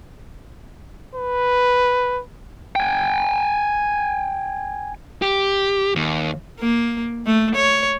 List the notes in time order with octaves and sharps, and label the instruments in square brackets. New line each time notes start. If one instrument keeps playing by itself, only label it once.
[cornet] B4
[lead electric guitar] G5 G#5
G4
D#2
[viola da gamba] A#3
A3
C#5